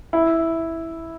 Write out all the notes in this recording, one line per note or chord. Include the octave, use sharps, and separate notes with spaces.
E4